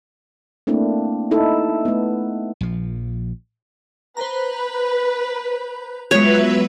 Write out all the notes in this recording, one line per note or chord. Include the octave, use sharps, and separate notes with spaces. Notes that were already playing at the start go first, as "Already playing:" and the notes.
A3 A#3 C4 D4 E4
D#4 E4 A4
A3 B3
A#1 F3
B4 C5 A#5
F#3 G#3 B3 F4 B4 C#5 E5